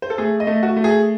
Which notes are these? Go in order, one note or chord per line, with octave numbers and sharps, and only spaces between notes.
C5
A4
A3 G#4
D#5
A3
F#4
A3
G#4